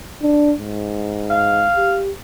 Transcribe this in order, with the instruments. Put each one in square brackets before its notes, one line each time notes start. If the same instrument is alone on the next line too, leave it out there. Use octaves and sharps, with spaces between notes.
[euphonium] D4
G#2
[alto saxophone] F5
[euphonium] G4